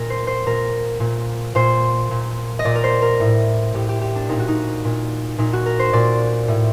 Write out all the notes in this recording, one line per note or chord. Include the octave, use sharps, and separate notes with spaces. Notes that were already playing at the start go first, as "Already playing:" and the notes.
Already playing: A#2 A#4
C5
C5
A#2 A#4
A#2
A#2 C5
A#2
D#5
A#2 D5
A#4
C5
A#4
A2
A2 G4
G4
G4
D4
A#2 D#4
F#4
D#4
A#2
A#2 D#4
F#4
A#4
C5
A#2 D5
A2